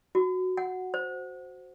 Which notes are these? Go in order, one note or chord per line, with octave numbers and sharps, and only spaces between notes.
F#4
F#5
C5